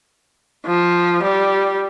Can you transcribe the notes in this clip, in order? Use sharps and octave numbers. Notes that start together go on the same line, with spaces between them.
F3
G3